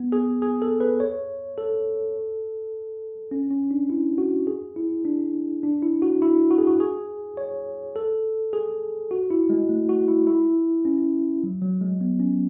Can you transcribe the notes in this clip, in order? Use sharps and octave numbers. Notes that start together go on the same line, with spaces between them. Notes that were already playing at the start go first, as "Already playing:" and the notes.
Already playing: B3
G#4
G#4
A4
B4
C#5
A4
C#4
C#4
D4
E4
F#4
G#4
E4
D4
D4
E4
F#4
E4
F#4
G#4
F#4
G#4
C#5
A4
G#4
F#4
E4
G#3
A3
F#4
E4
E4
C#4
F#3
F#3
G#3
B3
C#4